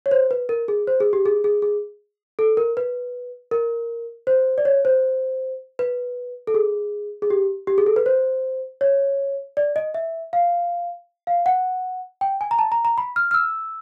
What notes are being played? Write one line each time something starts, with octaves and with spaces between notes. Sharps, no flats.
C#5
C5
B4
A#4
G#4
C5
G#4
G4
G#4
G#4
G#4
A4
A#4
B4
A#4
C5
D5
C#5
C5
B4
A4
G#4
G#4
G4
G4
G#4
A4
B4
C5
C#5
D5
D#5
E5
F5
F5
F#5
G5
G#5
A#5
A5
A#5
A#5
B5
F6
F6
E6